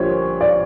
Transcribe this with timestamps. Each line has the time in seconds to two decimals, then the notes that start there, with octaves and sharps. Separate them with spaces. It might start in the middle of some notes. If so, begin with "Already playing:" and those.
Already playing: A#1 A#2 G3 C5 C#5
0.41 D5